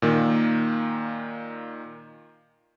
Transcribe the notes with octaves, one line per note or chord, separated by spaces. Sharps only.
A#2 D#3 A#3